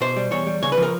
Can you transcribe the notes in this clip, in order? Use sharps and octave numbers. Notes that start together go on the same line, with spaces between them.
B2 C5
G3
E2 C#5
G3
C#3 C#5
B4
F3
A#4